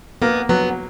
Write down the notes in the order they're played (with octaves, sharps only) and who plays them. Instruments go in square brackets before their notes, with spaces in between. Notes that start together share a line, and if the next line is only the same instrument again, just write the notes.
[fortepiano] A#3 [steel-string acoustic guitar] B3
[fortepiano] F#3 [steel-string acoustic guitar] B3